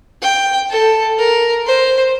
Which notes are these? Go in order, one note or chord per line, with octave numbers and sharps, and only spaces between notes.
G5
A4
A#4
C5